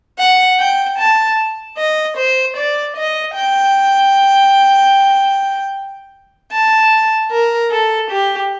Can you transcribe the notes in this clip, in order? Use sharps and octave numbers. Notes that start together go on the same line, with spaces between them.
F#5
G5
A5
D#5
C5
D5
D#5
G5
A5
A#4
A4
G4